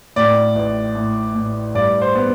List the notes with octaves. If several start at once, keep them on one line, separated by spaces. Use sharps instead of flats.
A2 D5
A1
A2
A2
G2 D5
C5
B3